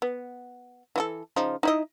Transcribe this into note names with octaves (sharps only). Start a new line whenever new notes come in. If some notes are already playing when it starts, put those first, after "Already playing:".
B3
E3 F#4 A4
C#3 F3 D#4
D#4 E4 D#5